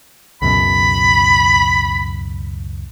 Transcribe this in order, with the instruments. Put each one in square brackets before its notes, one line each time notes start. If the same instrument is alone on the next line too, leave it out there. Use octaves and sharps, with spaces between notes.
[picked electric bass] C#2 F#2 B2 [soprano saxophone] B5